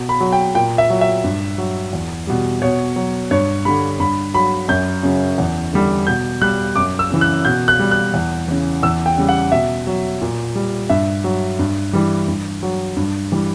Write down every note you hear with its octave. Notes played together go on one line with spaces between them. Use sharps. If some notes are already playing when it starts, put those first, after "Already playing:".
Already playing: B2
B5
F#3
G5
A#2 G5
E5
F#3
E5
G2
F#3
E2
B2 G3
B2 C#5
F#3
G2 C#5
D3 G3 B5
G2 B5
F#3 B5
F#2 G6
C#3 F#3
E2
D3 G3
B2 G6
G3 F#6
F#2 D6
E6
C#3 E3
F#6
B2 G6
F#6
G3
F#6
E2
C#3 E3
E2 E6
G5
C#3 G3
F#5
B2 E5
F#3
A#2
G3
G2 E5
F#3
G2
E3 G3
G2
F#3
G2
E3 G3